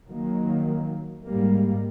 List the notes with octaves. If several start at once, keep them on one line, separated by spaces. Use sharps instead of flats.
D#3 F#3 A#3
G#2 G3 A#3